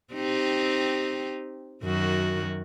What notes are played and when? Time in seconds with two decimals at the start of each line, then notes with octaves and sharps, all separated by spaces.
0.14 C4 D#4 G4
1.83 F#2 D#3 F#4